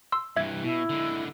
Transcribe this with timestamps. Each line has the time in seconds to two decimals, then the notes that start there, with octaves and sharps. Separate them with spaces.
0.12 C6 E6
0.36 G2 E3 E5 G#6
0.63 B2 E4
0.90 D3 G#3